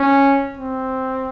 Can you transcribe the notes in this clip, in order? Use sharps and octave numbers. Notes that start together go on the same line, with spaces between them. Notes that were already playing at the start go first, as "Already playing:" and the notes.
Already playing: C#4
C4